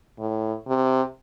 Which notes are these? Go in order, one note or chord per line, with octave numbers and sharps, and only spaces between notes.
A2
C3